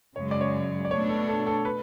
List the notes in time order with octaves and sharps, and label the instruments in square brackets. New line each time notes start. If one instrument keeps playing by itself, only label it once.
[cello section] F#2 C#3 G#3 [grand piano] C#5
[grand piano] D5
C#5
D5
[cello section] B2 A3 D4 [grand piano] C#5
[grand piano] A4
A4
A4
B4